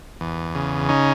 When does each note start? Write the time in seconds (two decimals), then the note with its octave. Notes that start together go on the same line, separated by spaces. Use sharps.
0.21 E2
0.55 C#3
0.89 C#4 D#4